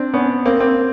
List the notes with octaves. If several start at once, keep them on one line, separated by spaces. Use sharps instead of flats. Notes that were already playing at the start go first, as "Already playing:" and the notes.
Already playing: C4 D4
B3 C#4
A#3 C4
A#3 C4